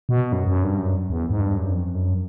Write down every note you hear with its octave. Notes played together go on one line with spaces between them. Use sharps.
B2
F#2
F#2
G2
F#2
E2
G#2
G2
F#2
F2
F#2